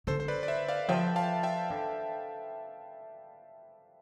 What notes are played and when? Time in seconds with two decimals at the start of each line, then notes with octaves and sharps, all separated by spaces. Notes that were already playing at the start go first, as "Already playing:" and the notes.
0.07 D3 A4 C5
0.20 C5
0.28 B4 D5
0.43 D5
0.48 C5 E5
0.68 D5 F5
0.88 F3 E5 G5
1.16 F5 A5
1.43 E5 G5
1.70 D3